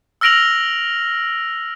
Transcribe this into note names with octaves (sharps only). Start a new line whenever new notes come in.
E6 F6 A#6 D7 F7 F#7